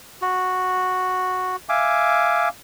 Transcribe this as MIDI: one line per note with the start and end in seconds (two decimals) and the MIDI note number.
0.22 1.56 66
1.69 2.49 76
1.69 2.49 77
1.69 2.49 80
1.69 2.49 86